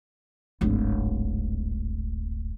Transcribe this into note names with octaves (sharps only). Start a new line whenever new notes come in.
D1 G#1